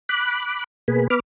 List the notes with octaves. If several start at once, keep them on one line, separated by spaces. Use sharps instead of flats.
B5 D6 F#6
B2 A#3 G#4 B4
B3 B4 D6 F6